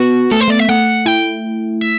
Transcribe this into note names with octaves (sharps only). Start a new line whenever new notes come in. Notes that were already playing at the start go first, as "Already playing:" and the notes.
Already playing: B3 F#4
A3 A4
C5
A3 D5
E5
A3 F#5
E4 G5
E5